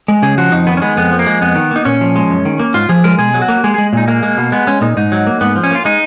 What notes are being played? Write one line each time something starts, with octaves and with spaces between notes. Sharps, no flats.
G#3
C#3 G#4
F3 F#4
F2 D#4
D#3 B3
C#4
G#3 B3
F2 B3
F3
A#3
G#3
F2 B3
D#3
A#3 D#4
A#2 C#4
F3
G#3
F#2
D#3
A#3
G#2 F4
F3 G#4
G#3 A#4
B2 G#4
F#3
F#4
A#3
G#3 G#4
G#3 G#4
A#2 D#4
G#3 A#3
G#3
B2
G#3 B3
G#3 C#4
A#2 D#4
G#2 D#4
F#3
A#3
G#2 B3
F3
C#4
A#3 F4
G#3 D#4